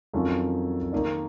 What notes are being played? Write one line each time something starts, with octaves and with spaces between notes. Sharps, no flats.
F2 D#3 F#3 C#4 F4
D#3 A#3 D#4